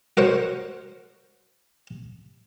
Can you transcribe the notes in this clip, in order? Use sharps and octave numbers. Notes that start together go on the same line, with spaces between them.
F#4 A#4 C5 C#5